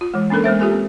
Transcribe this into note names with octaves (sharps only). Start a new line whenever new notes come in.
F4
E3 G#3
A#3 C#4 D4 A4 A#4
G#3 B3 C5 E5
F4 G4 A4 G#5
C4